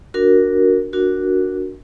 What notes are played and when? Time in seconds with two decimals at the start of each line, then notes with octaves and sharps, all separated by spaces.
0.14 D4 F#4 A#4
0.93 D4 F#4 A#4